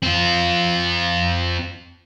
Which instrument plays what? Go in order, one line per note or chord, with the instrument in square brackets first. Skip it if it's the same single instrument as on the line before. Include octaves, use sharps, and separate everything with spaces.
[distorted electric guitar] C4 F4